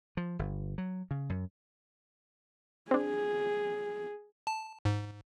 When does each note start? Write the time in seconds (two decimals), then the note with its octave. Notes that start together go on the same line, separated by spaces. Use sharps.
0.17 F3
0.39 G1
0.78 F#3
1.11 C#3
1.30 F#2
2.91 C4 D4 G#4
4.47 A5
4.85 G#2